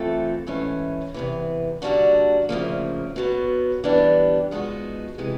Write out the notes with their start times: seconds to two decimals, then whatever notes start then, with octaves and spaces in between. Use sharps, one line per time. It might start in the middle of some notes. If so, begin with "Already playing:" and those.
Already playing: E3 A3 C4 F4 A4
0.47 G#2 E3 A3 C#4
1.14 E2 C3 E3
1.82 D3 G3 A#3 D4 F#4
2.49 D2 C#3 F3 A#3
3.16 B2 F#3 B3
3.84 E3 G3 B3 D4 G4
4.51 F3 G#3 B3 D#4 F#4
5.18 C3 E3 G#3